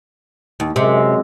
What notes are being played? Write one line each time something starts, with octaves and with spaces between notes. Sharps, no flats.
D#2
F#2 C3 G#3